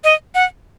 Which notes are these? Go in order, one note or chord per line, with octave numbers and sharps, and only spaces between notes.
D#5
F#5